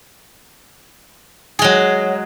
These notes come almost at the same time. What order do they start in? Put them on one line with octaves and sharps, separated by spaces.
G#4 G#3 F#3